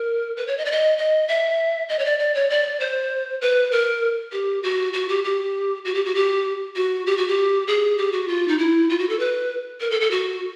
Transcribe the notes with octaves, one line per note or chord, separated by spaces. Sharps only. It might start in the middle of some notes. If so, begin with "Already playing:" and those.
Already playing: A#4
B4
C#5
D#5
D5
D#5
D#5
E5
D#5
C#5
D5
D5
C#5
D5
C5
B4
A#4
G4
F#4
F#4
G4
G4
F#4
G4
F#4
G4
F#4
G4
F#4
G4
G#4
G4
F#4
F4
D#4
E4
F4
F#4
A4
B4
A#4
A4
A4
F#4